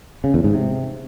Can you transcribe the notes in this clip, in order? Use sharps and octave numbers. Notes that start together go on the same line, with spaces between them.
C#3
E2
G#2
C3